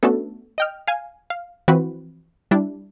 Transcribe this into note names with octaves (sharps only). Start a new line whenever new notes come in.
A3 B3 C#4 D4 F#4 A4
D#5 G5 F6
F5 G#5
F5
E3 F3 C4 F#4 B4
G3 D4 E4